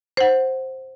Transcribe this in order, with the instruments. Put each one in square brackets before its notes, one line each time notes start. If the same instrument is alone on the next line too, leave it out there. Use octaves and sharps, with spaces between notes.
[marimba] C5 F#5